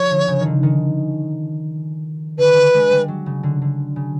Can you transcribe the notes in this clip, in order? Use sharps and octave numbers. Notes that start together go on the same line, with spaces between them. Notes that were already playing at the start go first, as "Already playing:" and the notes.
Already playing: F3 C#5
D3
C#3
D#3
D3
D#3
D3 B4
D3
G#3
G3
F#3
C#3
D3
D3
C#3